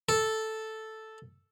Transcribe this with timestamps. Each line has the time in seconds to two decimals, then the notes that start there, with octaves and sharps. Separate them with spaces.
0.09 A4